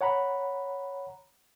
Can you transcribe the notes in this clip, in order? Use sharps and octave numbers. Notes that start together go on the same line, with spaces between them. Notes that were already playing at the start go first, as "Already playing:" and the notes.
C#5 F#5 A#5 B5